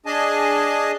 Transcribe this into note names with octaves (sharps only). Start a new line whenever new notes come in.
D4 G#4 D#5 G#5 A5